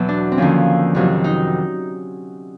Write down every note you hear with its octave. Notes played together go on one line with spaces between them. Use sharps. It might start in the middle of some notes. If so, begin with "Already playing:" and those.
Already playing: E2 B2 F#3
D4
C4
D#2 D3 F3 C#4
F2 C3 D#3 F#3
D#4